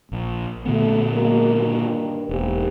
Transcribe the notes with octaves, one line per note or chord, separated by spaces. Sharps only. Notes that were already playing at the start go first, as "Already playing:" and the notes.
A#1
A#2 D3 A3 B3
F#3 G#3 A#3
G2 D#3 A#3
E1 G#2 A#3 G4